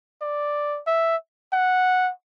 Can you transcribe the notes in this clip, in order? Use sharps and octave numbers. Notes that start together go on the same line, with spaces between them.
D5
E5
F#5